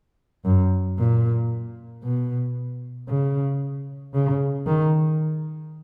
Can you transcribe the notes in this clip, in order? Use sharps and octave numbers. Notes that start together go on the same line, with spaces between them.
F#2
A#2
B2
C#3
C#3
D#3